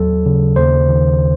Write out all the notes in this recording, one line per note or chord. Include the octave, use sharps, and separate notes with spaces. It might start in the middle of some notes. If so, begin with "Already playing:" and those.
Already playing: D#2 F#3 A4
C#3
D#2 C5
D#3